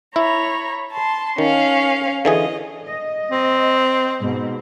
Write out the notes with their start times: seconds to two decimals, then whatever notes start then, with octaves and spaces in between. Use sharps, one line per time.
0.16 E4 C#5 A#5 B5
0.92 A5 C6
1.38 D#3 C#4 F5
2.25 D3 E3 G#4 D#5
2.86 D#5
3.31 C4
4.20 G#2 B2